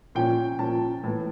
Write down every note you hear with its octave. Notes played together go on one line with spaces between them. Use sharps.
A#2 F3 C#4 G5
A#2 F3 C#4 A5
A2 E3 A3